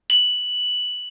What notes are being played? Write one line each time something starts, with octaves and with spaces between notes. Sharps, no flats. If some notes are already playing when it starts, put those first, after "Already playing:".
F#7